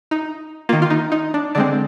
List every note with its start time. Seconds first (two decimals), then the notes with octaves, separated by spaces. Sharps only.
0.11 D#4
0.69 D#3 A#3 F4
0.82 F4
0.90 D#4
1.12 D#4
1.34 D4
1.55 D3 G#3 C4 D4